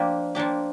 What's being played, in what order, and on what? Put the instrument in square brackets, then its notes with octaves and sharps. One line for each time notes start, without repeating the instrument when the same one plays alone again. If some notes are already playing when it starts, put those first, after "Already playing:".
Already playing: [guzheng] F3 A#3 D4 G4
F3 A#3 D4 G4